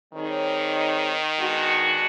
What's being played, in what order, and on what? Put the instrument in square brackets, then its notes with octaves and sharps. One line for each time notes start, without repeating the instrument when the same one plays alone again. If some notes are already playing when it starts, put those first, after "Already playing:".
[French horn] D#3 [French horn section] G3 C4 D#4 G#4 C#5
[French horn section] G#3 B3 D4 F#4